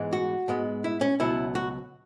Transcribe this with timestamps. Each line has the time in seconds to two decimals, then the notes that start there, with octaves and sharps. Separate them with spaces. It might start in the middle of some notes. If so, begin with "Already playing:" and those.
Already playing: G#2 E3 G#3 B3
0.13 F#4
0.48 G#2 G#3 B3
0.84 E4
1.01 C#4
1.20 C#2 B2 F#3 B3 E4
1.55 F#4